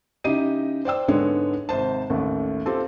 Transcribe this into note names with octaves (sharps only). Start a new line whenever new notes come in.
C#3 D#4 E4 G4 D#5 D#7
C5 D5 G5 E6
G#2 D3 G#3 B3 C#5
G#1 C3 C5 A5
A1 D#2 A2
C4 F4 G4 A4